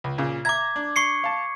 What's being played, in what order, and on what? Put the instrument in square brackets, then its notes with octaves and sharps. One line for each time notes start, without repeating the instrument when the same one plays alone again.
[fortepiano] C#2
A#2 C#3
[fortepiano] E5 A#5 [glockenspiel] D6 G#6
[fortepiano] D4
[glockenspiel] C#6 C7 C#7
[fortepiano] F5 A5